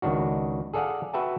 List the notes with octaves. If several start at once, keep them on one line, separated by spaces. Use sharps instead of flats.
C#2 D#3 D4 F#4
G#4 A4 D5 F5 F#5
F#4 B4 E5 G5 A5